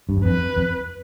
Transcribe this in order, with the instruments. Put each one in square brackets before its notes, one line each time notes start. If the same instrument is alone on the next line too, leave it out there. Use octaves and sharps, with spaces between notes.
[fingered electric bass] G2
F#2
[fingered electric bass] F2 [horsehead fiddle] B4
[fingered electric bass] F2